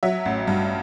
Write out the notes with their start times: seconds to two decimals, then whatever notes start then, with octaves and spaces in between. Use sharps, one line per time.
0.03 F#3 E5
0.25 A1
0.47 G2